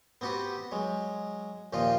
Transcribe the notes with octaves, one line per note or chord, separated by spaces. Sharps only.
B3 C4 F#4 G4 B4
F#3 G#3
D#2 A#2 F3 F4 D#5